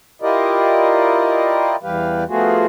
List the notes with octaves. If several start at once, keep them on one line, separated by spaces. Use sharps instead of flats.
E4 F4 G4 A#4 D5 D#5
E2 E3 G3 G4 B4 F5
F3 A3 B3 F4 F#4 G#4